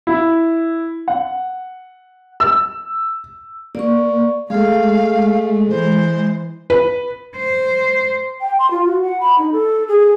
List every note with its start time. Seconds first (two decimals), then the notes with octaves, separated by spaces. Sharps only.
0.07 E4
1.08 F#5
2.40 E6
3.75 A#3 D5 C#6
4.50 G#3 A3 G#4 A4 F5
5.70 E3 C5
6.70 B4
7.36 C5
8.41 G5
8.59 C6
8.71 F4
8.86 F#4
9.02 F#5
9.20 B5
9.38 D#4
9.52 A4
9.88 G#4